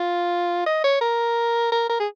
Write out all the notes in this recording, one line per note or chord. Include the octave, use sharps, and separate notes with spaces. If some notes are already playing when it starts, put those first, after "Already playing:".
Already playing: F4
D#5
C#5
A#4
A#4
A#4
G#4